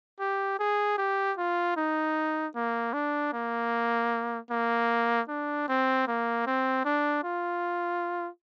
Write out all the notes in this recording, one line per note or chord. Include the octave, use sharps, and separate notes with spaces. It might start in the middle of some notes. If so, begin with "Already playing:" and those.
G4
G#4
G4
F4
D#4
A#3
D4
A#3
A#3
D4
C4
A#3
C4
D4
F4